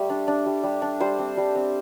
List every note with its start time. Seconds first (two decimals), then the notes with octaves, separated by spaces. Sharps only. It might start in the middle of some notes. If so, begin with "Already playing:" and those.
Already playing: G3 A3
0.10 D4
0.28 D4
0.46 G3
0.63 G3
0.82 D4
1.00 G3 C5
1.19 C4
1.37 G3
1.55 C4